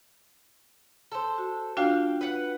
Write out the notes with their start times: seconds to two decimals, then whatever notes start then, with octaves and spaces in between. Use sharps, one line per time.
1.12 A4 C5
1.38 F#4
1.77 D4 F4 F#4 F5 G5
2.21 B4 F#5